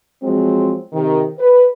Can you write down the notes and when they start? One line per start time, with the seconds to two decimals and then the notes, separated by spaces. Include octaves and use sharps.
0.23 F3 F#3 G#3 C4
0.93 C3 D#3
1.39 B4